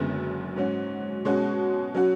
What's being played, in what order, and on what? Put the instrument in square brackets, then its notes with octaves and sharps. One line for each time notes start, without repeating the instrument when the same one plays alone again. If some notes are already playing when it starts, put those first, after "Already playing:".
Already playing: [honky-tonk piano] F#1 F#2 D3 G#3 B3
G#2 F#3 C#4 F#4
B2 G#3 C#4 F#4
F#3 C#4 F#4